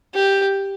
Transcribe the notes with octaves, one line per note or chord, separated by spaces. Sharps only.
G4